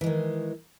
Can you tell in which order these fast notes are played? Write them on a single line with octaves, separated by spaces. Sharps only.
E3 G#3 D#3